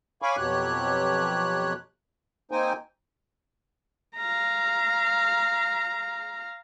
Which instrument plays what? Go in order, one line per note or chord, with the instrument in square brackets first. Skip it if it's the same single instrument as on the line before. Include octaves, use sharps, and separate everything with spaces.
[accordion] C#5 F5 G#5 B5 C#6 D6
F2 B2 F#3 G4 C#5 F#6
A#3 C4 D#4 C5 G5 G#5
[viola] F5 A#5